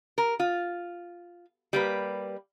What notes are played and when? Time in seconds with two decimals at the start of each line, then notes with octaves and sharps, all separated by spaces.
0.18 A#4
0.40 F4
1.73 G3 A#3 B4